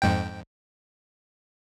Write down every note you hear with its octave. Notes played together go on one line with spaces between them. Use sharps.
F2 G#2 G5